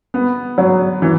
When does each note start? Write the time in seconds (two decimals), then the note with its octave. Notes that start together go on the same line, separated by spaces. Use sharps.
0.14 B3
0.58 F#3
1.02 E3